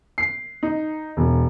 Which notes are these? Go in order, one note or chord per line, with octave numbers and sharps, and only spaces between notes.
C7
D#4
E1